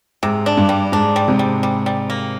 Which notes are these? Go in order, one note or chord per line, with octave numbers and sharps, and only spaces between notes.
G#2 C3
D4
G2
G3
G#2 D4
G3
G#2 C3
G3
G3
G3
A#3